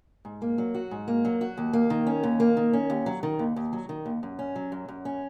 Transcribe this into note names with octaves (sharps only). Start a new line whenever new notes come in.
G#2
A#3
F#3
F#4
G#2
A#3
F#3
F#4
D#2
A#3
D#3
C#4
D#2
A#3
D#3
C#4
D#2
F#3
D#3
D#2
D#2
F#3
D#3
D#2
F#2
C#4
F#3
F#2
F#2
C#4